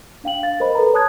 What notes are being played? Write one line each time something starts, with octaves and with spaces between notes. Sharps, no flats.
D4 F5 G5 F#7
F5 A6
A#4 C5 D#5 B5
A4 B4 A#5
C#5 A5 D#6 F#6 G#6